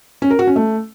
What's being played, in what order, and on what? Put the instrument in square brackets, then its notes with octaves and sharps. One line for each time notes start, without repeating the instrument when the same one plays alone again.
[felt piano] C#4
A#4
F#4
C#4
A3